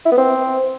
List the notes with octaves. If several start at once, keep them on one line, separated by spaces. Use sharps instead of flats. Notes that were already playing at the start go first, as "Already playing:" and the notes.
E4
B3
C4